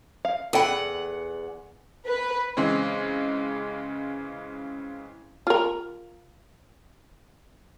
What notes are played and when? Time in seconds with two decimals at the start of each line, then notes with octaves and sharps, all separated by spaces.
0.25 F5
0.53 E2 A4 F#5 G5 B5
2.06 B4
2.57 C#3 E3 G#3 C4
5.47 F4 A#4